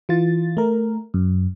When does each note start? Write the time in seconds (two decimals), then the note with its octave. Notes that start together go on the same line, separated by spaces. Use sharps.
0.09 E3 F4 A6
0.57 A3 A#4
1.14 F#2